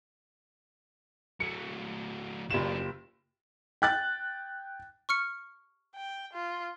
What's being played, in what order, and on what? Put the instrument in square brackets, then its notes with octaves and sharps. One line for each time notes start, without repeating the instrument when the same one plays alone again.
[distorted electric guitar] F#3 A3 [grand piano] C#7
[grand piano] F#1 E7 [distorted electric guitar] F#3 D4 [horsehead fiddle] F4 G4
[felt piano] G5 F#6 A6
[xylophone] C#6 F6 C#7
[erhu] G5
F4